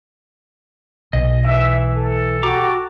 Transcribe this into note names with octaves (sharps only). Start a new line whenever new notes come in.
B1 D#5
E3 E5
A4
F#4 G4 A#5 D6